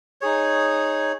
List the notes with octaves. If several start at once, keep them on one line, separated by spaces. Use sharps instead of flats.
D#4 G#4 C#5